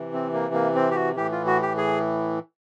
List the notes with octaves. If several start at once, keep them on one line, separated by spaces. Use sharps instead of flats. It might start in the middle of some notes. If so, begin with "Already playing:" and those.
Already playing: C3 E3
C4
A#3
A#3
C4
G4
F#4
A2 E3 G4
F4
F#4
G4
G#4